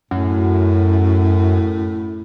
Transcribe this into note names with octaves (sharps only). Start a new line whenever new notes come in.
F#2 A2